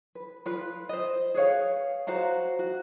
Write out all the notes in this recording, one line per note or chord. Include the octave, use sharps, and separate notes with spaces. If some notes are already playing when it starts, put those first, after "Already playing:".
B4
F4 B4
C5 D#5
G#4 B4 C#5 F5
F#4 C5 F5 A#5
F#4